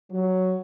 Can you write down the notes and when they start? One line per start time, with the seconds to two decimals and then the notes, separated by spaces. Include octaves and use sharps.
0.11 F#3